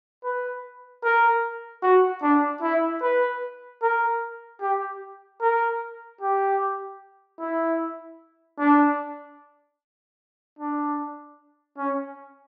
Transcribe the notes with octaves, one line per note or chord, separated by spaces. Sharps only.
B4
A#4
F#4
D4
E4
B4
A#4
G4
A#4
G4
E4
D4
D4
C#4